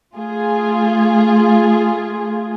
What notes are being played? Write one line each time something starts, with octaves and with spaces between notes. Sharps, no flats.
A3 F4 G#4